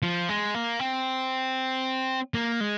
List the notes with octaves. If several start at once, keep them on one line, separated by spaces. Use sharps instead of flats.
F3
G#3
A#3
C4
A#3
G#3